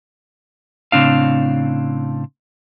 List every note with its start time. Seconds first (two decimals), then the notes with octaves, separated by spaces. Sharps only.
0.92 A2 C#3 C4 D4 F5